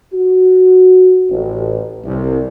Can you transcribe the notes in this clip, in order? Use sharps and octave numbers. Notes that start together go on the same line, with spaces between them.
F#4
A1
C2